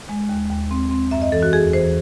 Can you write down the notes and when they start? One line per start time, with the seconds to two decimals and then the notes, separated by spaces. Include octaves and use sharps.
0.09 G#3
0.29 D#2
0.50 D#2
0.71 C4
0.91 C4
1.11 F#2 E5
1.22 D#5
1.32 E3 A4
1.43 F#4
1.53 E2 G#4
1.73 E3 C5